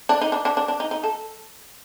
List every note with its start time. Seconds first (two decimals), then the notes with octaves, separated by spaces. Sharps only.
0.09 D4
0.21 D#4
0.32 D4
0.45 D4
0.57 D4
0.68 D4
0.80 D#4
0.91 D#4
1.04 A4